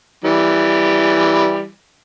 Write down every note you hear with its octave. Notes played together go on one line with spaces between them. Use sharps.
E3 G3